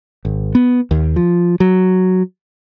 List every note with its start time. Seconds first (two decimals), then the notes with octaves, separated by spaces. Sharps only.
0.25 G#1
0.55 B3
0.91 D#2
1.16 F3
1.60 F#3